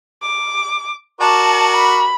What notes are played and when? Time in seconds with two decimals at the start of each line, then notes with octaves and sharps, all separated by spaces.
0.22 D6
1.21 F#4 A#4 D5 A5
1.77 B5